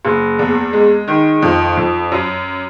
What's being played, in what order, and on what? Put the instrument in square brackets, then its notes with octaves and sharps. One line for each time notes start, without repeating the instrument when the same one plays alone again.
[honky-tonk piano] F#1
E2
G#3
D#3
F2
F2
F#2